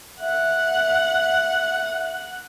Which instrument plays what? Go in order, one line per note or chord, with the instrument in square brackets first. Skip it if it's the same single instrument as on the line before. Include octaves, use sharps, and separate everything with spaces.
[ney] E5 [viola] F#5